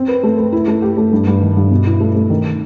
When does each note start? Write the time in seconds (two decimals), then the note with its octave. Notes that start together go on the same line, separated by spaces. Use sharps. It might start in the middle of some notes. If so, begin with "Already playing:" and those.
Already playing: C4
0.08 B4
0.23 A3
0.38 B4
0.52 E4
0.68 A3
0.82 G4
0.97 A3
1.12 G2
1.27 G2
1.42 D#3
1.57 G2
1.71 B2
1.87 E4
2.01 A3
2.16 A3
2.30 D#3